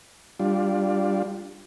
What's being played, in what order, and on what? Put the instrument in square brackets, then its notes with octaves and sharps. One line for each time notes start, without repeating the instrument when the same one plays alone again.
[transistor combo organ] G3 D4 F4